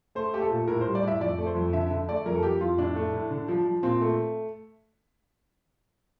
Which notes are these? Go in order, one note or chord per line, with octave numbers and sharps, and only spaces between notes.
A3 C5
A3 G4
A4
A#2
A2 A#4
G3 C5
D5
A2 E5
F2 D5
A3
C5
F2
D3 E5
D3 E5
A3 D5
F2 A#4
A4
F2 G4
F2 F4
A2 D4
A3
A2
D3
F3
F3
A#2 C4
A3